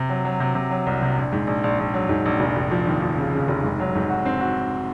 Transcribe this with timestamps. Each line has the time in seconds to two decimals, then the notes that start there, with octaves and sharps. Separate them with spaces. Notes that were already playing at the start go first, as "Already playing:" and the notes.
Already playing: C3
0.09 F#3
0.25 F#3
0.40 C3
0.55 C3
0.71 F#3
0.87 C2
1.02 C3
1.17 A#1
1.32 G#2
1.47 A#1
1.64 A#1
1.79 A#1
1.94 F#3
2.09 G#2
2.26 A#1
2.40 F1
2.56 F1
2.71 F3
2.87 D#2
3.02 F3
3.18 C#3
3.33 C#3
3.48 F1
3.63 G#2
3.80 F#3
3.95 G#2
4.10 F#4
4.25 C4
4.40 F#4